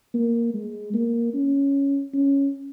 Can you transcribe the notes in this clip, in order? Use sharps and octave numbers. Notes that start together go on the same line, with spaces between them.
A#3
G#3
A#3
C#4
C#4